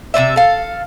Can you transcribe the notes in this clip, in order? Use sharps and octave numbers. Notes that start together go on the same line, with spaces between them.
C3 C4 D5 E5
A4 F5